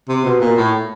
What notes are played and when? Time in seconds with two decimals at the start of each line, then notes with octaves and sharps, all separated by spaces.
0.08 C3
0.25 B2
0.40 A#2
0.57 A2